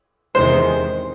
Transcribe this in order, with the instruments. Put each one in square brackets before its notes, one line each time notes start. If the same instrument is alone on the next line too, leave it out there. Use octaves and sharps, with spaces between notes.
[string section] E2 C3 D#3 G#3 [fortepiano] C5